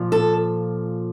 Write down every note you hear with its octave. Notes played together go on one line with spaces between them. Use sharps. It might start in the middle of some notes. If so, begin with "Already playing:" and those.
Already playing: A#2 F3
A4